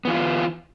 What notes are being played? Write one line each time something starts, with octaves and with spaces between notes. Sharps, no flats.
E3 B3 F4